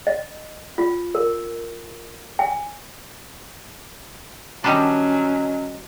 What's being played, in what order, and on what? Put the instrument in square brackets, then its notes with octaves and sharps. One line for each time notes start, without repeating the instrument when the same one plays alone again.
[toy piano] D#5
F4
A#4
G#5
[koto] D#3 G3 D4 [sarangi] F#3 [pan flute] C#4 [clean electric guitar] D#5 A5